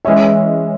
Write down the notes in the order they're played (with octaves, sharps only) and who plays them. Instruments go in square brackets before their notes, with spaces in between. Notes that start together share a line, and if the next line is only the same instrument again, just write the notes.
[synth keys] E3 G#3 C#4 [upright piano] E5